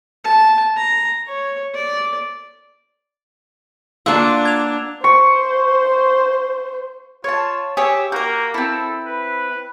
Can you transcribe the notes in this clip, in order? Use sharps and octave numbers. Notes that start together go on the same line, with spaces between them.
A5
A#5
C#5
D5
A#3 D4 F4 F#5 C#6 E6
G#6 F7
C5 C#6
F4 C#5 A5
G4 G#4 C#5 E5
A#3 F#4 A#4 G6
C4 E4 A4
B4